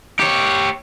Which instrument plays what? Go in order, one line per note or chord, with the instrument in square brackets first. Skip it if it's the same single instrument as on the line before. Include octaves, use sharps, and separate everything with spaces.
[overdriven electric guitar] G4 C#5